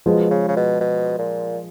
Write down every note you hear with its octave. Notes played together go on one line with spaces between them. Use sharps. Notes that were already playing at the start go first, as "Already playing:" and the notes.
B2 F3 G#3
C#3
C#3
B2
B2
A#2